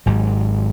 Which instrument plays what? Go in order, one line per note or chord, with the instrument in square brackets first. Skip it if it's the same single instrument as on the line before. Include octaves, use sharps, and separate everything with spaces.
[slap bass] G#1 G#2 F#3